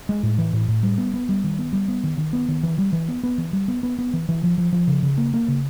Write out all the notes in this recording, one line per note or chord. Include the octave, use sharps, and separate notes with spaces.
G#3
A2
E3
A2
A2
G3
B3
B3
G3
D#3
B3
G3
B3
D#3
D#3
B3
D#3
E3
G3
E3
B3
B3
E3
G3
B3
B3
B3
E3
E3
F3
F3
F3
C#3
C#3
A#3
A#3
C#3